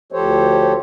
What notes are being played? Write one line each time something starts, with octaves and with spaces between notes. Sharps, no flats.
D2 F3 G4 A4 C5 C#5